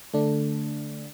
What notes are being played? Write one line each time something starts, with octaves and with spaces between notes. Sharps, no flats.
D3 A3 D4